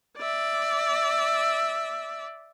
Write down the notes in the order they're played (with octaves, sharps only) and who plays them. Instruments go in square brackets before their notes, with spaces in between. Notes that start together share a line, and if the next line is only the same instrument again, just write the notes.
[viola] D5 E5